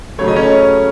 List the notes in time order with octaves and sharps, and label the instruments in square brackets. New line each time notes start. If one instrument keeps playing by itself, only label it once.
[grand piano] C#3 F#3 A3 C#5
D#5
C#4 C#5